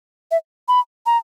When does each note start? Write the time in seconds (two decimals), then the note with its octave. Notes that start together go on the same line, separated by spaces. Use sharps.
0.31 E5
0.68 B5
1.06 A#5